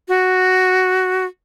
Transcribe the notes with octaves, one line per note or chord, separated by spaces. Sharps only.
F#4